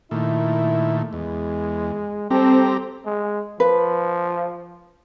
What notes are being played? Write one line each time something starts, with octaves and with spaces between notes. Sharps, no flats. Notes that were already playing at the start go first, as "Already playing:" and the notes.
A#2 D#3 A3 E4
E2 G#3
G3 C4 G4 A4 A#5
G#3
F3 B4